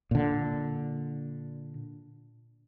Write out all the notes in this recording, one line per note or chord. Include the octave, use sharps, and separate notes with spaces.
A#2 D3